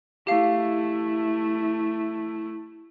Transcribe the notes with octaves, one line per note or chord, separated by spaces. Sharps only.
A3 E4 G4 F5